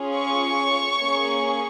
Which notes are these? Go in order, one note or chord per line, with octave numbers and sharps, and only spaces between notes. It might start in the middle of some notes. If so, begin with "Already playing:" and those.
Already playing: C#4 F4 G#4
C#5 C#6
A#3 C#4 G#4